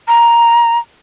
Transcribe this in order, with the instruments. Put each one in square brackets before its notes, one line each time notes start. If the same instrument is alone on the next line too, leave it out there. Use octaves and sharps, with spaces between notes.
[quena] A#5